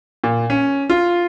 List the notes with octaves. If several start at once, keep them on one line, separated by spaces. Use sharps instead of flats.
A#2
C#4
F4